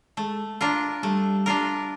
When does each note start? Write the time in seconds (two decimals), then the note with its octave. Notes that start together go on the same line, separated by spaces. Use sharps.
0.17 G#3 A3
0.61 D4 F4 A#4
1.03 G3 A3
1.46 D4 F4 A#4